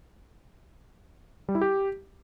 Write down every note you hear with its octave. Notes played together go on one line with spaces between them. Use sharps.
G3
E4
G4